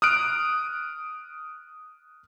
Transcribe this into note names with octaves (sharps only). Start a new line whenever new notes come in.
D#6 F6 F#6 D7